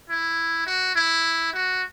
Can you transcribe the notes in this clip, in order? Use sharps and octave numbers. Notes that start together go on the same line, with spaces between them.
E4
F#4
E4
F#4